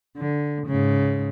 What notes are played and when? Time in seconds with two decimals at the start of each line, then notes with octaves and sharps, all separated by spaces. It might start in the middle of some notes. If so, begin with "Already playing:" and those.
0.18 D3
0.67 G#2 C#3